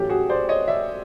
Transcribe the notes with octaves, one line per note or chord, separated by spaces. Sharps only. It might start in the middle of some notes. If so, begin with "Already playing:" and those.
Already playing: A1 A2 F#3 A3 C#4 G4
F#4 G#4
C5 D5
C#5 D#5
D5 E5